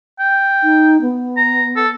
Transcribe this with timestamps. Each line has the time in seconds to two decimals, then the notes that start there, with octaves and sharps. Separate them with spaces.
0.19 G5
0.63 D#4
1.01 B3
1.37 A#5
1.76 A4